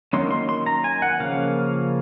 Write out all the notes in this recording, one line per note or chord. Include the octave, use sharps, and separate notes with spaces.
D#3 F#3 A#3 C#4 C6
C6
C6
A#5
G#5
F#5
C#3 F3 A#3 C#4 F5